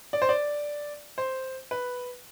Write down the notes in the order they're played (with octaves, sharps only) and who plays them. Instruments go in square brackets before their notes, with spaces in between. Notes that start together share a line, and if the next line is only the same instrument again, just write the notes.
[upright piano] D5
C5
D5
C5
B4